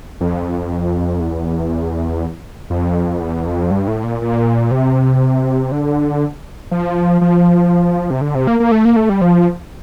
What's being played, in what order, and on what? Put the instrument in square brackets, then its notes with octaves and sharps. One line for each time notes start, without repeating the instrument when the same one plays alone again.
[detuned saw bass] F2
E2
F2
E2
F2
G2
A2
A#2
A#2
C3
D3
F3
F3
C3
D3
C3
A#3
A#3
A3
A#3
A3
G3
F3